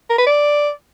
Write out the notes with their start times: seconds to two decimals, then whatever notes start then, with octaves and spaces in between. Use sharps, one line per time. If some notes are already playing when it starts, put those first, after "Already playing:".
0.10 A#4
0.18 B4
0.26 D5